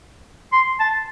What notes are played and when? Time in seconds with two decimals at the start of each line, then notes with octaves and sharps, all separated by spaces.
0.52 C6
0.79 A5